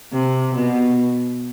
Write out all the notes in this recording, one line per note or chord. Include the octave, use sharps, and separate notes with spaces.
C3
B2